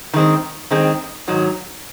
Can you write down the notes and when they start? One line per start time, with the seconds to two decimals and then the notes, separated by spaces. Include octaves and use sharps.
0.14 D#3 G#3 C4
0.71 D#3 G#3 C4
1.28 G#2 D#3 F#3